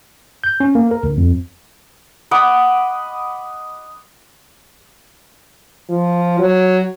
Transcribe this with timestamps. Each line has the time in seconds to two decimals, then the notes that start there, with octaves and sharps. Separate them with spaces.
0.44 G6
0.60 C#4
0.75 A#3
0.91 A#4
1.03 D2
1.17 F2
2.31 D#5 F#5 B5 D6
5.90 F3
6.39 F#3